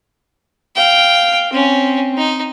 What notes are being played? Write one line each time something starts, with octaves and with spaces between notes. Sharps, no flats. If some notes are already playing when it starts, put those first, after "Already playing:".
F5 G5
C4 C#4
D#4